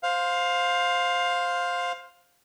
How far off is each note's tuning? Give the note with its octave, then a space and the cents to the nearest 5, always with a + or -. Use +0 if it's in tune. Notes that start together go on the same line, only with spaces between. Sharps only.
C5 +0 F5 +15